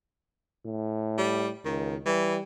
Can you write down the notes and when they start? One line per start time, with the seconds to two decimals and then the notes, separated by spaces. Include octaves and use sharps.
0.66 A2
1.18 G3
1.65 C#2 D#3
2.06 E3 G3